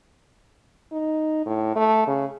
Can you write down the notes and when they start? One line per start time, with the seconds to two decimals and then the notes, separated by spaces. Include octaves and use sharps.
0.92 D#4
1.46 A2
1.76 A3
2.08 C#3